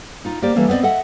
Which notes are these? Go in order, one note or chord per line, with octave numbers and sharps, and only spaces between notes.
D#4 F4
A#3 G4 C5 D5
E3 G3 A3 A#3 C#4
B3 C4 B4 D5 D#5
A4 D#5 E5 F#5